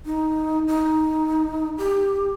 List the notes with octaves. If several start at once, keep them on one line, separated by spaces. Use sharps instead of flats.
D#4
D#4
G4